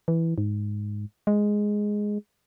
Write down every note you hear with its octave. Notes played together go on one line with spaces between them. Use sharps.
E3
G#2
G#3